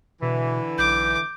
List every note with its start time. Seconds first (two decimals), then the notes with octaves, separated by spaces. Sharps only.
0.22 B2 D3 E3
0.78 B1 D6 G6